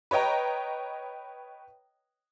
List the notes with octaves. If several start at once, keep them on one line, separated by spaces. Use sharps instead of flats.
B4 C#5 D#5 G5 A#5